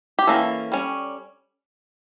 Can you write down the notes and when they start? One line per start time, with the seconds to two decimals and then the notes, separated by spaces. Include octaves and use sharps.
0.19 G4
0.27 E3 A#3 C#4 A4
0.72 G3 C#4